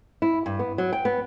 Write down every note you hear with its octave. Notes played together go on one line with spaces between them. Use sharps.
E4
G2
B3
F#3
G5
B3